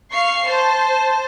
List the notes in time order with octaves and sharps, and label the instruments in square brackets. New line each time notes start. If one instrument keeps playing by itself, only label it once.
[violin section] F5 C#6 C7
C5 A5